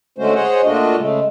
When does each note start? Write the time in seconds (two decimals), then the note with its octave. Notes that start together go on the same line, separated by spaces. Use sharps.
0.18 D3 G#3 A3 C#4 F#4 C5
0.35 G#4 C5 C#5 D#5 F#5
0.64 A#2 A3 D4 F4 F#4 D#5
0.97 C#3 G#3 A3